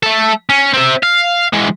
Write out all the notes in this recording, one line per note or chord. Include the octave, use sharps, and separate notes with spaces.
A3 A4
C#4
C4 E5
F5
E3 G#3